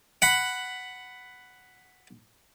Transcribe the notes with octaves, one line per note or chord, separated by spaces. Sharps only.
F#5 B5